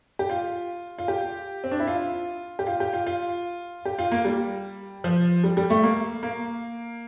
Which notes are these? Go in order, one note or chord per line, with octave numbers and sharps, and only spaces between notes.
G4
F4
F4
G4
C4
D4
E4
F4
G4
F4
G4
F4
F4
G4
F4
A#3
G3
F3
G3
G3
A3
A#3
A#3